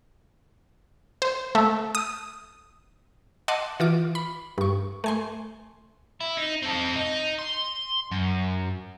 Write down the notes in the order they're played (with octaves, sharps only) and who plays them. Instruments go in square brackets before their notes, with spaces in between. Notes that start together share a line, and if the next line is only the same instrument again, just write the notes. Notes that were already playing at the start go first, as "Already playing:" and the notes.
[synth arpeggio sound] C5
A3
D#6
D#5 F#5 A5 C6 D6
E3 F4 D6
B5
G2 C#6
A3 G#5 C6
[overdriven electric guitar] E4
D#4
C4 A4
D#4
C6
F#2